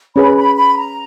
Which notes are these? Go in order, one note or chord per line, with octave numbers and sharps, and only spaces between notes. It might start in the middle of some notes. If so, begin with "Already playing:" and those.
C#4 G#4 B4 B5
B5
B5
A#5